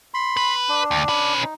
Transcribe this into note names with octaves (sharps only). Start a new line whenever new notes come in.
B5 C6
B4
D4
D2
C#4 B4
D#4